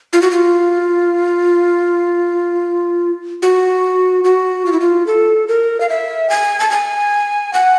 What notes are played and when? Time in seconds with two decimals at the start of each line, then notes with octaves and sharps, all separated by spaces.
0.13 F4
0.22 F#4
0.31 F4
3.42 F#4
4.24 F#4
4.66 F4
4.72 E4
4.80 F4
5.07 A4
5.48 A#4
5.81 F5
5.89 E5
6.30 G#5
6.60 A5
6.71 G#5
7.54 F#5